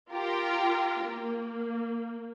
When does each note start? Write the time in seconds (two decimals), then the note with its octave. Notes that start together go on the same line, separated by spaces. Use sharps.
0.11 F4 G4 A#4
1.06 A#3